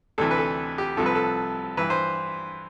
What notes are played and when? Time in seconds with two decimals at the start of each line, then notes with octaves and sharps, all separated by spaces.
0.18 D2 C3 E3 A4
0.31 B4
0.38 A4
0.78 G4
0.97 C2 C3 F3 A4
1.06 B4
1.15 A4
1.77 G2 E3 B4
1.90 C5